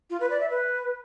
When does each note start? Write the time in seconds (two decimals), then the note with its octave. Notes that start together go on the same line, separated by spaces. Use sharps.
0.10 F4
0.20 B4
0.30 D5
0.40 E5
0.50 B4